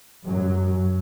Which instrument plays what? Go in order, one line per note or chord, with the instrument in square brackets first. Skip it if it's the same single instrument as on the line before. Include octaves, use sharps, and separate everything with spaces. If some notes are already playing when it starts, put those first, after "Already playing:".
[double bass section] F#2 F#3